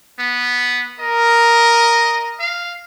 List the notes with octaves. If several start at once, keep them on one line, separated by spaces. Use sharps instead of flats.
B3
A#4 D#5
F5